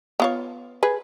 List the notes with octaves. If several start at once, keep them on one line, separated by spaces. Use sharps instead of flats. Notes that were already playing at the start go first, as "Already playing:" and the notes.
B3 F4 C#5
G#4 B4